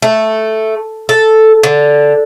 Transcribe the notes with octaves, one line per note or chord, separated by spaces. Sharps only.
A3
A4
D3